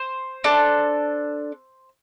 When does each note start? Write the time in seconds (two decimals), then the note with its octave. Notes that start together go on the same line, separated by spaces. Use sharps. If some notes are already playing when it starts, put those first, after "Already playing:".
Already playing: C5
0.44 D4 A4